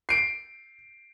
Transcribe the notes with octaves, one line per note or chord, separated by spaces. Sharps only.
C7 D7